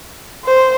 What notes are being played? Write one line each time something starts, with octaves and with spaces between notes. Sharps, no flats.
C5